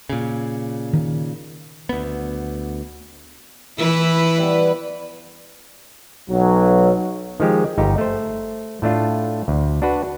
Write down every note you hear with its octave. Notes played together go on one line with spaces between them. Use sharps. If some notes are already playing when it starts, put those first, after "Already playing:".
A#2 C#3
D#3
D2 B3
E3 E4 B4
G3 B3
B1 F#3
D#3 F3 G#3 G4
G1 D#4 G4
A3 C5
A2 A3 D4 F4
D2
D4 F#4 B4